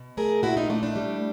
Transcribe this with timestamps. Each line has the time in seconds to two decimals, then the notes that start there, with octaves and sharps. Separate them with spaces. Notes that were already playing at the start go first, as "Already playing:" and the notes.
Already playing: B2
0.17 A3 G#4 A#4
0.43 A#2 E4 F#4
0.57 D#4 F4
0.70 A3 D4 E4
0.83 D4 E4
0.96 G3